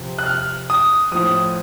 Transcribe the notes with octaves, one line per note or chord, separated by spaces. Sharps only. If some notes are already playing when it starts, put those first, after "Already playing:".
Already playing: C3 F3
F#6
F6
D#6
A2 F3 D#6